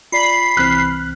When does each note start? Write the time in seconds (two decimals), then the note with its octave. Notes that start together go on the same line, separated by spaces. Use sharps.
0.12 F4 D5 A#5 B5 C7
0.57 C2 E3 C4 F6 F#6 B6